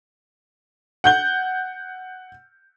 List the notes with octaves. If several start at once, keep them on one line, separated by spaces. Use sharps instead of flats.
F#5 G6 G7